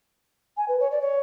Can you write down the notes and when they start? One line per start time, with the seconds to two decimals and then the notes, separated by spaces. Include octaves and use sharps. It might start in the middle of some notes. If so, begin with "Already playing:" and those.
0.57 G#5
0.68 B4
0.80 C#5
0.91 D5
1.02 C#5